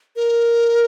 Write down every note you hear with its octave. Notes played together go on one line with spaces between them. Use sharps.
A#4